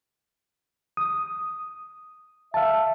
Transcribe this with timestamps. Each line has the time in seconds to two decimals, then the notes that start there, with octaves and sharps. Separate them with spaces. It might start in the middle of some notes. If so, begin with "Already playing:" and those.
0.97 D#6
2.54 E5 F5 A5